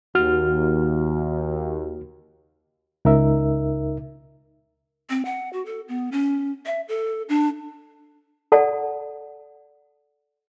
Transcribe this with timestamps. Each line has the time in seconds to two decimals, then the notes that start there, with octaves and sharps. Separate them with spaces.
0.15 D#2 F#4 F6
3.05 C#2 D#4 A#4 E5
5.10 C4
5.25 F#5
5.53 F#4
5.66 A4
5.88 B3
6.12 C#4
6.66 E5
6.88 A4
7.29 D4
8.52 A4 D5 F#5 A5